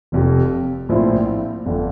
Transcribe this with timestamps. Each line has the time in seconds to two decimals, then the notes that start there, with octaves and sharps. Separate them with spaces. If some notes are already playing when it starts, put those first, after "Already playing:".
0.12 F1 F2 C3
0.89 A#1 A2 F3 C4 E4
1.66 G1 F2 D3